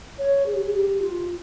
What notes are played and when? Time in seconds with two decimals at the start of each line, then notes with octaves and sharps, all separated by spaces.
0.18 C#5
0.46 G#4
0.55 G4
0.64 G#4
0.74 G4
1.02 F4